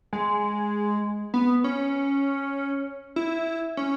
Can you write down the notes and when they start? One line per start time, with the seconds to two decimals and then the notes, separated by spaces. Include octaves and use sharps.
0.13 G#3
1.34 B3
1.64 C#4
3.16 E4
3.77 C#4